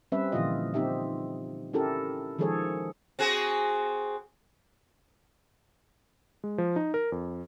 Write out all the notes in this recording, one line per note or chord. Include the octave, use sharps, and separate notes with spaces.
G3 C4 C#4 B4 E5
A#2 D3 E3 F3 F4 D#5
C4 D#4 G4 E5
C#4 E4 G4 A4 A#4
D#3 F3 G#3 G#4 A4 C#5
C4 F#4 G#4
G#3
F3
D#4
A#4
F2